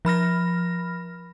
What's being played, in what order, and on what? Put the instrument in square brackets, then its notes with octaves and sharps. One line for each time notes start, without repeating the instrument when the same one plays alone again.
[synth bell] F3 B5 F6 A#6